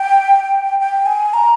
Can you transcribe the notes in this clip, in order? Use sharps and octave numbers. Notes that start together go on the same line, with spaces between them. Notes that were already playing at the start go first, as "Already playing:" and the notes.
Already playing: G5
G5
G#5
A#5